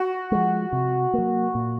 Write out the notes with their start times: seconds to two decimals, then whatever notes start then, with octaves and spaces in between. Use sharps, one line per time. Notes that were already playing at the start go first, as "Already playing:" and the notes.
Already playing: F#4
0.32 F3 G#3
0.73 C3
1.14 F#3 A#3
1.55 A#2